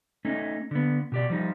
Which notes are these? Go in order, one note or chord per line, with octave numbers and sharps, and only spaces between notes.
A3 C#4 D#4
D3 B3
B2 G4 D5
F3 G3 D#4